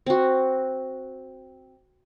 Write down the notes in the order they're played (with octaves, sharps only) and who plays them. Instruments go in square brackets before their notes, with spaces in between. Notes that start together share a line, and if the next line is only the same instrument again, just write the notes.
[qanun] C4 F#4